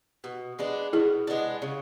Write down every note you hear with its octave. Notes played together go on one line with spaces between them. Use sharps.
B2
G#3 B3 D4
B2 E4 G#4
G#3 B3 D4
C#3